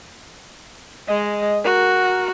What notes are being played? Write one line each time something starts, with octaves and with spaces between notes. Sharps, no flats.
G#3 D#5
F#4 A#4